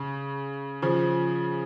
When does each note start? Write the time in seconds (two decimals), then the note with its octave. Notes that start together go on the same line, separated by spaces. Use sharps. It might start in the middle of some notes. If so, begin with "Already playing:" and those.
Already playing: C#3
0.82 C#3 F3